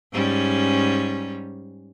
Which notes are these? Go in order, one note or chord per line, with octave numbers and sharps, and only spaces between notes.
G#2 G3 C#4